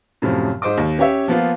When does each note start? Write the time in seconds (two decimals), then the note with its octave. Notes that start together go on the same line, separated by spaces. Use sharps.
0.22 F#2 A2 C3 F3
0.62 G#2 C5 D#5 D6
0.77 D#2
0.99 C#4 G4 C#5 E5
1.28 F3 A#3 B3 F4